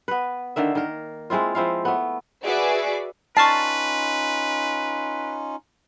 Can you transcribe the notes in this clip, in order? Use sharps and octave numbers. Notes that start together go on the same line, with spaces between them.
B3 B4
D3 D#3 A#3 E5
D#3 A#4
G#3 C4 E4 F4
F3 C4 E4 F5
A3 B3
F#4 G#4 B4 D5 E5 D6
C#4 D#4 F4 B4 A5 C#6 F6 C7